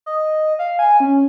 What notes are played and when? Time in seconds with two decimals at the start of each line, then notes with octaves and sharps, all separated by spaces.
0.06 D#5
0.59 F5
0.79 G#5
1.00 C#4